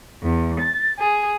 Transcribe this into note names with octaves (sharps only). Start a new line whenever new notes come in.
E2
A6
G#4